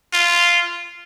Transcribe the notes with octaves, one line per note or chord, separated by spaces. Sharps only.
F4